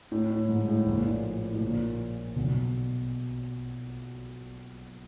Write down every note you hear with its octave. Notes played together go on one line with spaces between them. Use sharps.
A2
A2
G#2
A2
A#1 A#2
A2
A2
A#1 A#2
B1 B2